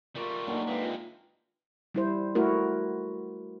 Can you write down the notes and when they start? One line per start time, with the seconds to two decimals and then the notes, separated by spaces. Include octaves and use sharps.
0.16 G3 A3 F4 A#4 A#5 C#6 D6
0.47 D3 F#3 A#3 D#4 G#5
0.67 G#3 C4 G4 B4 E5 F5
0.82 F4
1.95 G3 E4 C5
2.35 A3 E4 F#4 A#4